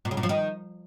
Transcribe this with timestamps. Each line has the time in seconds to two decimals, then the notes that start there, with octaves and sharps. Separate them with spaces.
0.05 A#2
0.11 C#3
0.17 A#2
0.23 F3
0.29 D#3